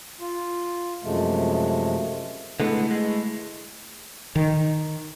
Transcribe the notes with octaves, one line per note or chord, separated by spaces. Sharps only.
F4
F#2 C3 F3 G#3 A3
D3 G#3 A3 B3 E4
G#3
D#3